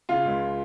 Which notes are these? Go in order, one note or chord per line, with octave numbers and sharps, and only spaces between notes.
C#3 F4
C#2